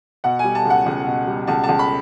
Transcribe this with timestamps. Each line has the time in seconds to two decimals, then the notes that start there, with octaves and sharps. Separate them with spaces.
0.24 B2 F#5
0.39 G#5
0.44 G3
0.55 A5
0.65 C#2 F#5
0.86 C#2
1.07 B2
1.27 G3
1.47 C#2 A5
1.64 A5
1.69 C#2
1.79 B5